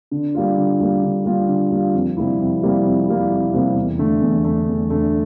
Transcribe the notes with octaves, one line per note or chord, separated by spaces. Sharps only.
D3
G3 A#3 F4
D3
G3 A#3 F4
D3
G3 A#3 F4
D3
G3 A#3 F4
F2
C3 G3 A#3 E4
F2
C3 G3 A#3 E4
F2
C3 G3 A#3 E4
F2
C3 G3 A#3 E4
E2
D3 A3
E2
D3 A3
E2
D3 A3